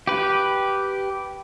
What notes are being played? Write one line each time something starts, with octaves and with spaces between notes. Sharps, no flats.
G4 B4